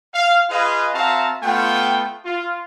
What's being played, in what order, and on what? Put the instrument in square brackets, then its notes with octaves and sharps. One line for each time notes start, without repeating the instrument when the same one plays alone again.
[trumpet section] F5
F4 G#4 B4 D#5 F5
C4 F#4 E5 F5 A5 A#5
A3 B3 F4 F#5 G5
F4